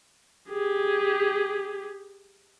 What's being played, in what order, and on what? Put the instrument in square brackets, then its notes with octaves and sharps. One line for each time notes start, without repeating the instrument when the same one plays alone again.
[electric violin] G4 G#4